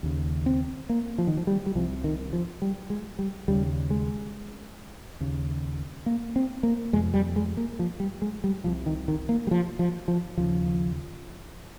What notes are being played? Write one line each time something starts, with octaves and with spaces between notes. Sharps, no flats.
D#2 C#3
C4
A#3
F3
D#3
F3
G3
G3
C2 C3 F3
D#3
F3
G3
G#3
G3
D#2 C#3 G3
G#3
D#2 C#3
A#3
C4
A#3
F2 C3 G#3
G3
G#3
A#3
F3
G3
G#3
G3
C2 C3 F3
D#3
D#3
A#3
G3
F3
F3
F3
D#2 C#3 F3